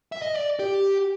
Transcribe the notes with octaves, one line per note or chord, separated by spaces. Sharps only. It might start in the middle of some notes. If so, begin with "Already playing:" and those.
E5
D#5
D5
G4